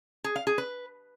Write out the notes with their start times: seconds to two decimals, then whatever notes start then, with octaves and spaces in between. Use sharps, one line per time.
0.24 G#4
0.36 F5
0.47 G#4
0.58 B4